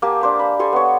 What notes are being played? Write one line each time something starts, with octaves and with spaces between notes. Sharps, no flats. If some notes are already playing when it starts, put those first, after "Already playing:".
A#3 G4 G#5 A5
D4 C5 F5
B5
G4 A4 C5 G#5
B3 C#5